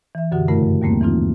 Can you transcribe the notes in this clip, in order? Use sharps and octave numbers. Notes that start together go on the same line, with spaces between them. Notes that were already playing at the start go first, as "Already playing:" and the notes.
E3 E5
F#2 B2 D3 F#4 G4 F#5
G2 C#3 A3 E4 F#4 A#4
D#2 G3 A3 A#3 C4
E3 F3 C4 D#4 F4